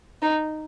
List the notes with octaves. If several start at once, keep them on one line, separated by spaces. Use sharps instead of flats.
D#4